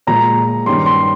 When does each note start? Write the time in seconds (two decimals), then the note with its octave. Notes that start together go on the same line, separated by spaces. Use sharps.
0.07 A#2 F3 G#3 A#5
0.66 G2 D#3 G3 C#4 C6
0.86 C6